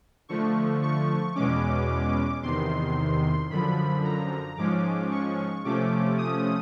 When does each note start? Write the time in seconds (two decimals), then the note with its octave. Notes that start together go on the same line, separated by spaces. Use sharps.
0.29 D3 F3 A3 C#6
0.82 C#6
1.35 E2 B2 G#3 C#4 D6
2.43 E2 C3 D#3 C6
3.50 F#2 D3 F3 B5
4.04 A#5
4.57 G#2 F3 G#3 C#4 D6
5.11 C#6
5.65 C3 F3 A3 C#4 D6
6.18 D#6